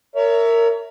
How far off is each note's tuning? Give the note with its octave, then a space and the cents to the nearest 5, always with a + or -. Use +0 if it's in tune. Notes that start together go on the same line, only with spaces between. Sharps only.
A#4 -15 C#5 +30 E5 +0